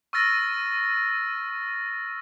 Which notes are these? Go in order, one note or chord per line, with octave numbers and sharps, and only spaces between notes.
C#6 E6 F6 A6 A#6 D#7